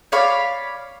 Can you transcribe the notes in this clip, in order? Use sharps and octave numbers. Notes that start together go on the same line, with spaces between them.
C#5 D5 F5 B5